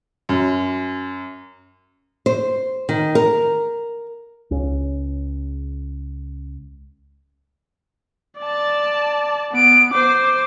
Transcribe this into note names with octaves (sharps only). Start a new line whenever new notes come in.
F#2
C5
D#3
A#4
C#2 C#4
D5 A5
B3 D7
C5 D6